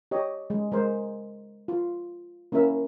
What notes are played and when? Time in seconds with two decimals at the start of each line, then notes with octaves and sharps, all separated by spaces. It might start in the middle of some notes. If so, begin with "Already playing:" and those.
0.11 G4 C#5 D#5
0.50 G#3
0.72 G#3 A#4 C5
1.68 F4
2.52 A#3 C#4 E4 A#4 E5